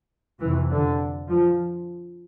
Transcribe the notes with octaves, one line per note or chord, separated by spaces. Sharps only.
F2 C3 E3
D3
F3